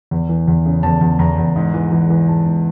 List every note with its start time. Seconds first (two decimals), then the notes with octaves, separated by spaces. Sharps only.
0.11 E2
0.29 E3
0.48 E2
0.66 C#3
0.83 E2 A5
1.01 E2
1.19 E2 A#5
1.38 E2
1.56 G#2
1.74 E3
1.92 E3
2.10 E3
2.28 G#2 A5
2.46 G#2